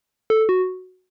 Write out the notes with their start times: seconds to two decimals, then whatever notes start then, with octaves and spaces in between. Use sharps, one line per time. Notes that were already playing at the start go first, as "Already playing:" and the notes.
0.30 A4
0.49 F#4